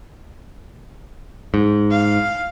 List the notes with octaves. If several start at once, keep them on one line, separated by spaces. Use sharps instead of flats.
G#2
F5